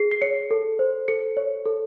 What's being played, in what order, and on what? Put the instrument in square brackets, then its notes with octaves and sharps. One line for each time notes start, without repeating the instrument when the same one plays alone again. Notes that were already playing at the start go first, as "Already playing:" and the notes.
Already playing: [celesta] G#4 C7
C7
C#5 C#7
A4
C5
A4 C#7
C#5
A4